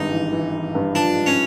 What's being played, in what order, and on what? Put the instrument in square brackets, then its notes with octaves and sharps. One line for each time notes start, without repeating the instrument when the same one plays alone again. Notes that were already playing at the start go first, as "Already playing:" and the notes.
Already playing: [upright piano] G#1 G2 [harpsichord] D#4
[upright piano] E3
E3
E3
G2
[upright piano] F3 [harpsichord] D4
[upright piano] G#2
[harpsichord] C#4